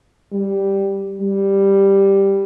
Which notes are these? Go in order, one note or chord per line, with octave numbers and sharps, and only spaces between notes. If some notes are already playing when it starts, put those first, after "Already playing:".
G3
G3